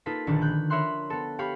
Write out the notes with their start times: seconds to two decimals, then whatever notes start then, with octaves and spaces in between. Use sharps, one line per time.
0.06 A#3 D#4 F4 A4 B4 B6
0.27 A#1 D3 D#3 D4 B4 C#6
0.41 B5 F#6 G6
0.70 A#4 C#5 E5 B5 C6 F#6
1.10 B3 A4
1.39 G4 C#5 F5 B5 C#6